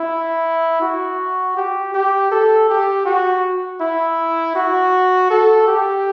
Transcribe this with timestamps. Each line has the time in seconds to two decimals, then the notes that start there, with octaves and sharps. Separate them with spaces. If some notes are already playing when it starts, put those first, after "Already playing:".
Already playing: E4
0.82 F#4
1.57 G4
1.94 G4
2.32 A4
2.69 G4
3.05 F#4
3.81 E4
4.56 F#4
5.30 A4
5.68 G4